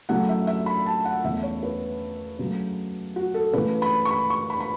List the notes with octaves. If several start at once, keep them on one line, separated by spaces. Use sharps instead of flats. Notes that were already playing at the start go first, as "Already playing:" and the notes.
C#3 F#3 A3 E4 F#5
E5
E5
B5
A5
F#5
E2 C#3 E3 A3 E4 E5
C#5
B4
C#3 F#3 A3
F#4
A4
C#3 E3 A3 B4
B5
C#6
B5
C#6
B5
B5